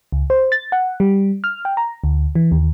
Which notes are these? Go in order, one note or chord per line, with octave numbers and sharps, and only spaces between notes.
C#2
C5
A6
F#5
G3
F6
G5
A#5
D2
E3
D#2